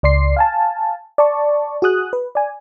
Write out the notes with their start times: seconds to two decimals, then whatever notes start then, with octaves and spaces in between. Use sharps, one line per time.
0.03 C#2 D5 C6 C7
0.37 F5 G#5 A5
1.18 D5 A5 C#6
1.82 F#4 G#4 D#6 F#6
2.13 B4
2.35 D5 G#5